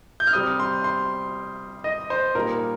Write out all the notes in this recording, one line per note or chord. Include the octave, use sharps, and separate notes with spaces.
G6
F6
C3 G3 C4 D#6
C6
C6
D#5
C5
A#2 G3 D#4 A#4